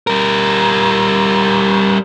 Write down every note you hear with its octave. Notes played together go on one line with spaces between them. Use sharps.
G3 A#4